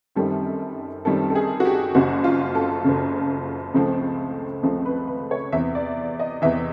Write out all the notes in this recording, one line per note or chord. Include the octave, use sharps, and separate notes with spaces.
F#2 D#3 G3 C4 A4
F#2 D#3 G3 C4 A4
A4
G#4
F#4
G4
F#1 F#2 C#3 F#4
F4
A4
F#1 F#2 C#3
C#2 C#3 F3 A3 C4
C#2 C#3 F3 A3 C4
B4
B4
C#5
E2 C3 E3 E5
D5
D#5
E2 C3 E3 E5